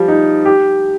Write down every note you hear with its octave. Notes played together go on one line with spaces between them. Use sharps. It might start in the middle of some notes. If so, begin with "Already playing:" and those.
Already playing: F3 G3
D#4
G4